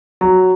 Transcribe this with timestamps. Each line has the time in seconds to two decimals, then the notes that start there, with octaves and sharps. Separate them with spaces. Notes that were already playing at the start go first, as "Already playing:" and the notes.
0.21 F#3